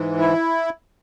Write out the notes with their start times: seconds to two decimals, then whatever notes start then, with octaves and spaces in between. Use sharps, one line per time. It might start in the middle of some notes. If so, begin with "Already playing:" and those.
Already playing: G#2 E3
0.19 E4